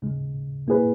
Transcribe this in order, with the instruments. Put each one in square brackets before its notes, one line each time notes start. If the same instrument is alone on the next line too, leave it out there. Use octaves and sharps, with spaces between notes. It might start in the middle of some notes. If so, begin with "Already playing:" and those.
[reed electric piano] D#2 C#3 G#3
A#2 A#3 E4 G#4 B4